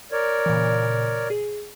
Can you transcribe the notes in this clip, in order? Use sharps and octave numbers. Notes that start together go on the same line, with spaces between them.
A#4 C#5 D5
A#2 C#3 E3
G#4